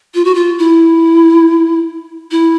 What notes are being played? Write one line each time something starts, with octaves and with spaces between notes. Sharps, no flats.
F4
F#4
F4
E4
E4